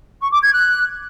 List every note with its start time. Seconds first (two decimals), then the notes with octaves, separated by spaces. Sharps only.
0.21 C#6
0.31 D6
0.42 G#6
0.53 F#6